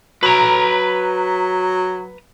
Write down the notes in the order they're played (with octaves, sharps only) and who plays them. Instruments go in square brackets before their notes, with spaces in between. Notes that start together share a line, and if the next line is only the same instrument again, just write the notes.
[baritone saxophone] F#3 [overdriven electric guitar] B4 A#5